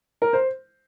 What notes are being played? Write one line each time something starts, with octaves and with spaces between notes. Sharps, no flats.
A#4
C5